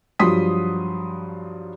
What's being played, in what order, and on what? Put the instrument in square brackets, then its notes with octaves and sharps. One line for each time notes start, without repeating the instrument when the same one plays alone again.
[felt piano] G2 F3 F#3 C6 D#6 B6